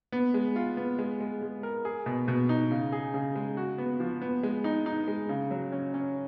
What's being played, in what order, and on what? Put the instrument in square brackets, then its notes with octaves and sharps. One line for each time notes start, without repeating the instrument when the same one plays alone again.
[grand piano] B3
G#3
F4
B3
G#3
G#3
G#3
A#4
G#4
B2
B2
D#4
C#3
G#4
C#3
G#3
F#4
B3
F3
B3
G#3
D#4
D#4
G#3
C#3
F#3
C#4
C#4